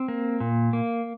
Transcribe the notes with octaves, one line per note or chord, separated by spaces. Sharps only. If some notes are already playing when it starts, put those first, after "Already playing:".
Already playing: C4
A#3
A#2
A#3